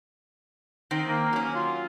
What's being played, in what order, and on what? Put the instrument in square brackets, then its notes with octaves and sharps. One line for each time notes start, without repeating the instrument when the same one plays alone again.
[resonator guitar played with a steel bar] D#3 C4
[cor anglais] A#3
[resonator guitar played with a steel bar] F#3 C#4
[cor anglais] F4